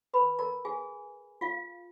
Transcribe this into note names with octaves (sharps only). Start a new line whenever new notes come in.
B4 B5
A#4 A#5
G#4 G#5
F4 F5